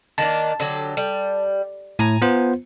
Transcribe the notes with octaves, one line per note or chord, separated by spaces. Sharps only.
D#3 A#3 D4 A5
D3 F#3 G4
G3
A2 G#5 A#5
B3 F4 C5